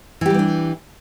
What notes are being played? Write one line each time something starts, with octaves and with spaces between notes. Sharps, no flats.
E3 G3 B3 D4 G4